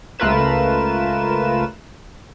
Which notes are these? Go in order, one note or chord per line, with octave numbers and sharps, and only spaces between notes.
C#2 A3 F4 A#4 B4 E7